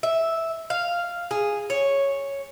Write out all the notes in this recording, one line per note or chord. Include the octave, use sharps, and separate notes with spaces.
E5
F5
G#4
C#5